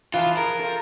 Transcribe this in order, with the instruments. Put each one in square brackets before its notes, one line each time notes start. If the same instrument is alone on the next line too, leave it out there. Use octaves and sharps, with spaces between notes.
[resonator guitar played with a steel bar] E3 F3 A5 [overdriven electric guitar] F4
[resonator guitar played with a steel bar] G#4 [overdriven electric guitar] A#4
[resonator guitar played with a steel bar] F3 A4